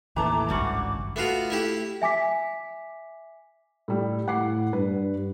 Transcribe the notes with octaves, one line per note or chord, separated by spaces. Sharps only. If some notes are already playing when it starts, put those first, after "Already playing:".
D#2 A2 E3 A3 A5 A#5 D6
G#1 C#2 G2 F#3 G3 F#4
A3 B3 F4 F#4
A3 E4 G4
E5 G#5 D6 B6
A2 G3
A2 F#5 D6 C7
G2 B4